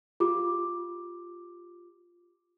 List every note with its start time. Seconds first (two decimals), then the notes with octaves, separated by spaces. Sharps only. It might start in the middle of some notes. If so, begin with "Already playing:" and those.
0.20 F4 G4 D6